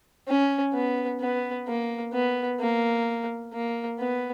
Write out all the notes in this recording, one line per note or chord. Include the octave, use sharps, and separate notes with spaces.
C#4
B3
B3
A#3
B3
A#3
A#3
B3